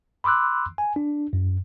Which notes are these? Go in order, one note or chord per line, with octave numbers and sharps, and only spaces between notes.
B5 C6 D6 E6 F#6
G#5
D4
F#2